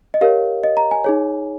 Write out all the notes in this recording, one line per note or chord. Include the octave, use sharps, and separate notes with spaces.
D#5
G4 A#4 C#5 F5
D#5
A#5
G#5
D#4 G#4 C#5